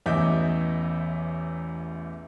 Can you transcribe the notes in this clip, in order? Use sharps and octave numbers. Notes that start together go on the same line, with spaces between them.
A1 E2 D#5 E5 D6 G6